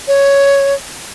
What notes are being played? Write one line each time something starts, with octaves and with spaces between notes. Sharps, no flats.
C#5